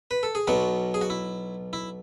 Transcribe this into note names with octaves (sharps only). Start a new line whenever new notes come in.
B4
A4
G#4
B1 B2 F#3 F#4
G#4
F#4
E4
E4